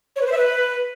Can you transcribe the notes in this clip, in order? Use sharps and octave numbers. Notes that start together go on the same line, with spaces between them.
C#5
B4
C5
E5
B4